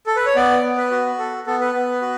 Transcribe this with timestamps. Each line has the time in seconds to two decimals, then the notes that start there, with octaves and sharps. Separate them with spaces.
0.07 A4
0.16 B4
0.26 C#5
0.35 B3 D5
0.64 B3
0.77 B4
0.91 F#4
1.19 A4
1.46 B3 A4
1.61 B4
1.75 B3
2.02 F#4